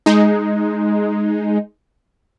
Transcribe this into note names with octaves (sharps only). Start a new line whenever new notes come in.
G#3 D#4